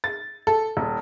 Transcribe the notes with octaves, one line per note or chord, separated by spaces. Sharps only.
A6
A4
D#1